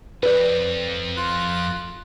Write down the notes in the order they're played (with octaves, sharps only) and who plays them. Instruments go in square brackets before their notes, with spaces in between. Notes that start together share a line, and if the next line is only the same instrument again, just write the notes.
[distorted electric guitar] B1 F2 [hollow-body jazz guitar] B4 D5
[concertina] F4 F#6